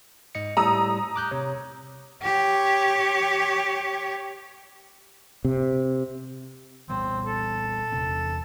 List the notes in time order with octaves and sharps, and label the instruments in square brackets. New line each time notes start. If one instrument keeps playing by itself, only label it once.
[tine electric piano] G#2 D#5 C#7
[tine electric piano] A2 G3 [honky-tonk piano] A#5 D#6 E6
[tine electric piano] D6 F#6 G6
C3 C#5
[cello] G4 C#5
[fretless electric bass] C3
[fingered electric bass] A#2 G3 B3 [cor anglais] C4
[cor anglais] A4
[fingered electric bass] E2 C3 C4